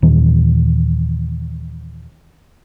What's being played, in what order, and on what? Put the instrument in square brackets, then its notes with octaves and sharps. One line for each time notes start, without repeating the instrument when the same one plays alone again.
[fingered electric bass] D#2 A#2 D#3 E3